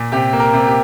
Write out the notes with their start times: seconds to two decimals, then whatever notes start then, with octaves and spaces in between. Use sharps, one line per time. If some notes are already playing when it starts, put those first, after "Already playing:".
Already playing: A#2
0.12 C3 G4
0.33 A#3
0.40 A#4
0.54 C3
0.67 G4